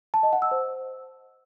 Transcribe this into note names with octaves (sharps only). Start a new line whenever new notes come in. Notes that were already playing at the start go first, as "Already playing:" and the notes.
A5
D#5
F#5
E6
C5